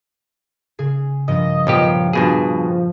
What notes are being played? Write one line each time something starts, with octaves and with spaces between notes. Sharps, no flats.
C#3 G#4
G2 F3 A#3 D#5
B1 A#2 F3 G4
G2 B2 F3 G#4